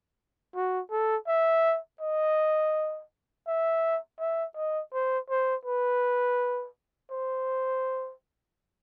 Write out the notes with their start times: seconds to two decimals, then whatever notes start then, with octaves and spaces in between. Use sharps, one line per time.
0.56 F#4
0.91 A4
1.27 E5
2.01 D#5
3.47 E5
4.19 E5
4.56 D#5
4.93 C5
5.30 C5
5.65 B4
7.11 C5